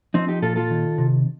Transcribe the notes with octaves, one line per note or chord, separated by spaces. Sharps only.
F3 C4 D#4
D#4 G4
A#2 F4 A4
F4 A4
D#3
C3